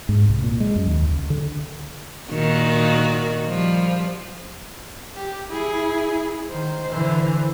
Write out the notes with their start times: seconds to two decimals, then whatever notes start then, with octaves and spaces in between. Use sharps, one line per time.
0.09 G#2
0.29 C2
0.44 A#2
0.60 G#3
0.76 F#2
0.87 D#2
1.10 C#2
1.30 D3
2.29 A#2 D#3 F#4
3.47 F3 G3
5.15 G4
5.48 E4 G#4
6.51 D#3 C5
6.87 D3 E3